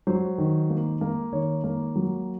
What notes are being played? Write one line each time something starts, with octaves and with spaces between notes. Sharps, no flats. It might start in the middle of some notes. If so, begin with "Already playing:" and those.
F#3 C5
D#3
A#3
A#3
D#3 C#5
A#3
F#3